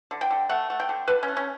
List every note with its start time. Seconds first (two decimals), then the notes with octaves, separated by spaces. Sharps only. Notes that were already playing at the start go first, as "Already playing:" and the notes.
0.11 D3
0.21 G5
0.30 D3
0.49 A3 F#5
0.70 A3
0.80 G5
0.89 D3
1.08 D3 B4
1.23 C#4
1.28 A3
1.37 C#4